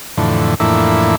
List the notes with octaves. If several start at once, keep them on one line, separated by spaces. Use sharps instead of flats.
F2 A2 D3 E3
F2 A2 E3 A#3 D4 E4